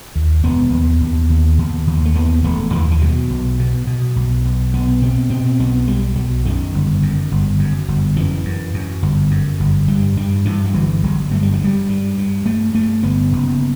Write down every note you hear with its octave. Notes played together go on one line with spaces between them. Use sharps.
D#2
E1 B3
D#2
D#2
D#2
D#2
D#2
A3
D#2 B3
E1 A3
D#2 E3
E3
B2 F#3
B1
B2
B2
B1
B1
B1 B3
B2 C4
B2 C4
B1 B3
B1 G3
B1 F#3
F#2 D#3
G1
F#2
G1
F#2
G1
F#2 E3
F#2
F#2
G1
F#2
G1
G2 G3
G2 G3
G2 E3
F#3
G1 E3
G1 F#3
G2 A3
G3
F#3
G2 G3
G2
G2
G2 A3
G2 A3
G1 B3
F#1